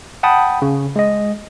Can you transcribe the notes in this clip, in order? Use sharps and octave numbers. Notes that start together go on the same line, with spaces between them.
F#5 G5 A5 B5 D#6
C#3
G#3 D#5